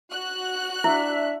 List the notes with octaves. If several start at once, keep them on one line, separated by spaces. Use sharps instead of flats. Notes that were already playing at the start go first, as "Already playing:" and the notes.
F#4 F#6
D4 E4 E5